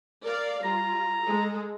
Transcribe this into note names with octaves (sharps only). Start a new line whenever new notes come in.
A#4 D5 F5
G3 F4 A#5
G#3 A4